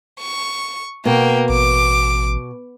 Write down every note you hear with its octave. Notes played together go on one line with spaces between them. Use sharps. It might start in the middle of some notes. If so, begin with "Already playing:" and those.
C#6
B2 A#3 G5
A1 D6